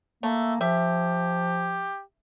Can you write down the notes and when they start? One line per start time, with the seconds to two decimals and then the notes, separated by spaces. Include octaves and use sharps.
0.23 A3 A#3
0.61 F3 G4 E5